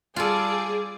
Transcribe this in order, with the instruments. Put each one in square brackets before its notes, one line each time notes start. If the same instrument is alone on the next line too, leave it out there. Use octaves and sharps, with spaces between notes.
[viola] G3 D5 [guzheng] F4 A4 [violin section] G#4